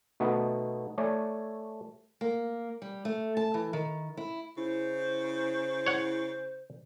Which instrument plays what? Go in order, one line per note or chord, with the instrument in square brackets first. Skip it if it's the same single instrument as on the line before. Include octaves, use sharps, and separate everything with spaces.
[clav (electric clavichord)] B2 A3 B3 D#4 F#4
A3 C#5 D5 G#5
[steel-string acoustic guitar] A#3
G3
A3
A5
E3
D#3
E4
[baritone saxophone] C#3 [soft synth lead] E4 [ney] C5
[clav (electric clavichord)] C#5 F#5